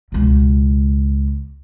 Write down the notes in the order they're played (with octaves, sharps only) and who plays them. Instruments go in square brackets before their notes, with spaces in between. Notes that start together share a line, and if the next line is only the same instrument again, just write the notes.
[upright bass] C#2 B2